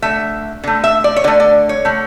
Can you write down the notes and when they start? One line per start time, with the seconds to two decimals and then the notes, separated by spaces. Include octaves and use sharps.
0.02 D3 A3 E5
0.64 D3 A3
0.84 E5
1.04 D5
1.16 C#5
1.24 D3 A3 D5
1.40 D5
1.69 C#5
1.85 D3 A3